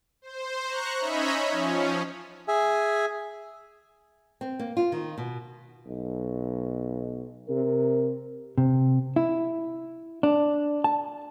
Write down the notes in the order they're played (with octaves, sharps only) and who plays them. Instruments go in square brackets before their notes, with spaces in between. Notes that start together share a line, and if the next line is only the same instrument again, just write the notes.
[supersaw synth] C5
A#5 C#6 F#6
C#4 D#4 C#5 D#5 E5 B5
F3 C#4
[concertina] G#4 E5 G#5
[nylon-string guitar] C4
A#3
F4
D#3
B2
[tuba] B1
[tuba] C3 [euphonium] A#4
[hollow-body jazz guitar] C3
E4
D4
A5